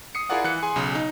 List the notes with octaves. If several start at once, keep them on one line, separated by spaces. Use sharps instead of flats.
D#6 C7 C#7
E4 F4 G#4 A#4 D5 F#5
E3 F#6 C#7
G#4 G#5 C6
B1 C#3
D#4